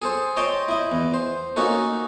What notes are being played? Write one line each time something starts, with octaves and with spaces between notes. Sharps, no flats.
G#4 A4 C5
C#5 D#5 G5 A5 C6
E4 D#5
E2
C5
A#3 C#4 D#4 F#4 A4